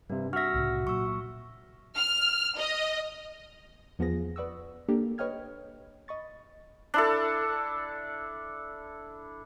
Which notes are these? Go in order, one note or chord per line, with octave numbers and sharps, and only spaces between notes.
G2 C3 D4
F#4 E5 F6 A#6
C2 A2 C#3
A#2 F#3 C#6 E6
F6
D#5
E2 F3 B3 F4 G#4 A#6
B4 D5 F#5 C#6 D#6 E6
A#3 D4 G4 A4 A#4
B4 C#5 D#5 G5 F6 G#6
D#5 B5 C#6 A6
D4 E4 A4